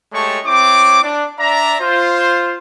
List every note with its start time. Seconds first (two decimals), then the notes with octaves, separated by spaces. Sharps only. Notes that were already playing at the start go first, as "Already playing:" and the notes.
0.13 G#3 A3 G4 C#5 A5 C#6
0.46 C4 E4 C#5 D6
1.03 D4
1.38 D4 D5 E5 A#5
1.81 F4 C5